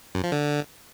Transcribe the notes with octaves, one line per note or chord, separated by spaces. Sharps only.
F#2
F3
D3